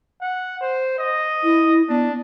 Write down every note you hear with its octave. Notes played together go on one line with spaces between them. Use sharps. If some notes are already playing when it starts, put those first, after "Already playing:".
F#5
C5
D#5
E4
B3 D4